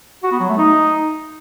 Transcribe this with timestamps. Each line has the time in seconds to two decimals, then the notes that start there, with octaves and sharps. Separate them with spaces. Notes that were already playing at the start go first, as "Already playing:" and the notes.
0.23 F#4
0.32 B3
0.40 F#3
0.49 A3
0.58 D#4